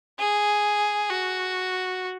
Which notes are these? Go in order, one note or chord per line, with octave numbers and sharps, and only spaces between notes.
G#4
F#4